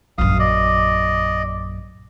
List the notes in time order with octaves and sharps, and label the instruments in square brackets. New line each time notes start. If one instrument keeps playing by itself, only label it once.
[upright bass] A#1 F#2 [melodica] F5 D#6
[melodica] D5 D#5